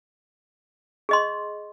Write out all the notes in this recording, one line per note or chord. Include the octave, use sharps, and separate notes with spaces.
G#4 D#5 C6